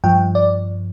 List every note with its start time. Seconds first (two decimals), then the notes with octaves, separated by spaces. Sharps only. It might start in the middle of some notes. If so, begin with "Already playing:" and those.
0.04 G2 F3 G5
0.35 D5